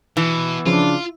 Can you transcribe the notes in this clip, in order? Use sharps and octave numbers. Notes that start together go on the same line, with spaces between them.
B2 E3
C#3 F3 D4 F4